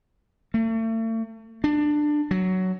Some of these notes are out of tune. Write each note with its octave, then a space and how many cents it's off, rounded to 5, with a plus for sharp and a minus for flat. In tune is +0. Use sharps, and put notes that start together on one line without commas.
A3 +40
D4 +20
F#3 +10